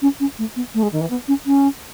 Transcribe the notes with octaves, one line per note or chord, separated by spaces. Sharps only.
C#4
C#4
A3
B3
A3
G#3
D#3
E3
B3
C#4
C#4